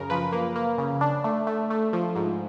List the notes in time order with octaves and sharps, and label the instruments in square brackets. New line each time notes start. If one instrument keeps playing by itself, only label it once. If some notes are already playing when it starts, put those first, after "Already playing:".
Already playing: [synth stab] F#2 C#3 A#4
F3 B4
A#3
A#3
C#3
D4
A3
A3
A3
F3
G#2